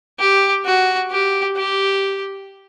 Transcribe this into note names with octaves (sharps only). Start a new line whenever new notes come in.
G4
F#4
G4
G4